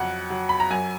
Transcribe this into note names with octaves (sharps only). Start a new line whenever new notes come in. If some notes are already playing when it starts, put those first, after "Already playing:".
Already playing: F2 F#3 F#5
F#3
B5
A#5
F#2 G#5